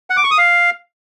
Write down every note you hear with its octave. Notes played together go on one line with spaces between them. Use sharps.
F#5
D6
C#6
D#6
F5